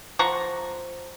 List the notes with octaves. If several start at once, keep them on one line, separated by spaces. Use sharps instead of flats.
F3 F#5 A#5 C#6